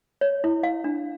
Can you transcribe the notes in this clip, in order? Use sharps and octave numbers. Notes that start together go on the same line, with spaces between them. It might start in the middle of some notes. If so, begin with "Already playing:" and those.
C#5
E4
F5
D4